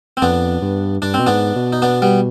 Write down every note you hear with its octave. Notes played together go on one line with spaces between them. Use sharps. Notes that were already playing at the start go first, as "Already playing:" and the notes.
C4
F2 B3 D4
G2
G2 D4
C4
B2
G#2 B3 D4
B2
D#4
B3 D4
G3 B3